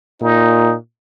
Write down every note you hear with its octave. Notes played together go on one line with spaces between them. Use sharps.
A#2 D#4